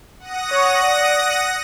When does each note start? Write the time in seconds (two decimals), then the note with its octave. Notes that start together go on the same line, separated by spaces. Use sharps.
0.19 F#5 D#6 A#6
0.50 C#5 C#6
0.84 D5